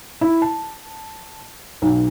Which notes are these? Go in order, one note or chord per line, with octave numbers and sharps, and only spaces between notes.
E4
A5
B1